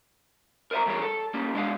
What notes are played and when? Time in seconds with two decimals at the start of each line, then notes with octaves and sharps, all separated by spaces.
0.71 A#4 C5 D#5 E5 A#5
0.86 E3 G3 G#4 A#4 C#5
1.02 A4
1.34 G3 A#3 C#4
1.54 B2 G#3 D4 B4 F5 F#5